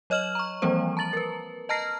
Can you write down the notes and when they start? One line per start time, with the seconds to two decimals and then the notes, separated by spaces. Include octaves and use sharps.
0.10 F#3 C#5 D#5 F6 E7 F#7
0.35 A#5 C#6
0.62 E3 F3 G3 A#3 C4 C5
0.97 A5 A#5 A6 F#7
1.13 A#4 B4
1.69 D#5 A5 A#5 F6 A#6 C7